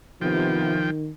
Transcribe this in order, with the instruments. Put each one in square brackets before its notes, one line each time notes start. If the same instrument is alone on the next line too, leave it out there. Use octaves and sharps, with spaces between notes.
[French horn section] C3 B3 F4 [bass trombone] D#3 [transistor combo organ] F3 G5